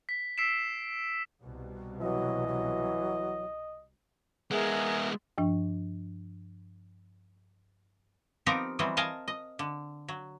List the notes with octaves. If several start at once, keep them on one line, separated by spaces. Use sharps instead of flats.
B6
E6 B6 C7 D7 E7
C2 B2
E3 F#3 D#5
F#3
G#3 B3 G#4 A#4 E5
G2 F3 D4
F3 B3 C4 D#4 G4 A#4
E3 F#3 G3 C4 D#5
A#4 D#5 F5 G#5 A5
D#5
D3
F#3